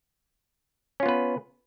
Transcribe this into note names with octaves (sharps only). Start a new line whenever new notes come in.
B3 C#4 F4 B4